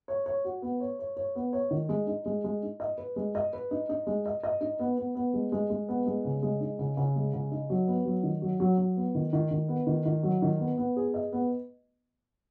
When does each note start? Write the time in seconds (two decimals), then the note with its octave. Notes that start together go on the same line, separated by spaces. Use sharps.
0.08 C#5
0.26 C#5
0.44 F#4
0.62 B3
0.80 C#5
0.99 C#5
1.17 C#5
1.35 B3
1.53 C#5
1.71 D#3
1.89 G#3
2.07 D#4
2.26 G#3
2.44 G#3
2.62 D#4
2.80 D#5
2.98 B4
3.16 G#3
3.35 D#5
3.53 B4
3.71 D#4
3.89 D#4
4.07 G#3
4.26 D#5
4.43 D#5
4.61 D#4
4.79 B3
4.98 B3
5.15 B3
5.34 G#3
5.52 G#3
5.70 G#3
5.89 B3
6.06 G#3
6.25 C#3
6.43 G#3
6.60 D#4
6.79 C#3
6.97 C#3
7.16 G#3
7.34 C#3
7.51 D#4
7.70 F#3
7.88 B3
8.05 F#3
8.23 D#3
8.42 F#3
8.60 F#3
8.78 F#3
8.97 B3
9.15 D#3
9.33 D#3
9.51 D#3
9.68 B3
9.87 D#3
10.06 D#3
10.23 F#3
10.42 D#3
10.60 B3
10.78 B3
10.97 G#4
11.14 D#5
11.33 B3